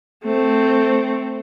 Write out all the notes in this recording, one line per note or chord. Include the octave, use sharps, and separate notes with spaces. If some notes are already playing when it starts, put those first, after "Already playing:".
A3 C4